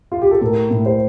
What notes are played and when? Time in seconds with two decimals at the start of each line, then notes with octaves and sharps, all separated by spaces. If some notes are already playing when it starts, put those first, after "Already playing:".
0.12 F4
0.22 G4
0.31 A4
0.41 A2 A#4
0.71 A2
0.86 C5